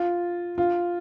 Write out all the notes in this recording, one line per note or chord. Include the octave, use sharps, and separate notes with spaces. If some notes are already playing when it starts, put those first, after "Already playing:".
Already playing: F4
F4